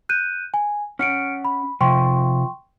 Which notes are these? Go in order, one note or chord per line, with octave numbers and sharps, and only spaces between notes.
F#6 G6 D#7
G#5
C#4 F#5 F6 C#7 D7
B5
C3 F3 G5 C6 C#6